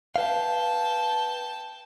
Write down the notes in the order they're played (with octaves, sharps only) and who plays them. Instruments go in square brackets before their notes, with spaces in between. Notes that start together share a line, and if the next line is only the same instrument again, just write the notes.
[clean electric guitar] B4 F5 [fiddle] G5 A5